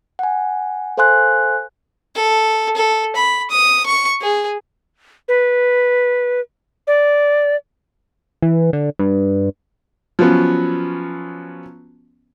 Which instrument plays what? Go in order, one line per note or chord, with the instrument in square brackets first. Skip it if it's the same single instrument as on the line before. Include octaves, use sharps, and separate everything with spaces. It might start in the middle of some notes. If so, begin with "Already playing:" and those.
[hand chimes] F#5 G#5
A4 C5 F5 G#5 C6 F#6
[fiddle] A4
A4
B5
D#6
C#6
G#4
[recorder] B4
D5
[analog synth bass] E3
D3
G2
[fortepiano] F3 F#3 B3 C#4